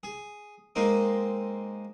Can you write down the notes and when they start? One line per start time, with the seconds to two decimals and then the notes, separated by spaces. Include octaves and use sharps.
0.03 G#4
0.76 G#3 A#3 C4 D#4